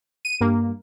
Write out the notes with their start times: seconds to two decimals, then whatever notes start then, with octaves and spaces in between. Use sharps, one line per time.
0.25 D#7
0.41 G2 A#3